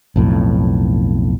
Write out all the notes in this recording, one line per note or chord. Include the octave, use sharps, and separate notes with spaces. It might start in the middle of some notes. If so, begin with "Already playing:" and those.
B1 F2 A2